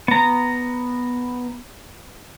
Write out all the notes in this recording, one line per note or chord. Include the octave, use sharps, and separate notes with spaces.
B3 A#5